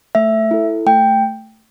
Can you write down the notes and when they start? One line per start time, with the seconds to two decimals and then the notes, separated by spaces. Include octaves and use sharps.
0.15 A3 E5
0.51 E4 A4
0.87 A3 G5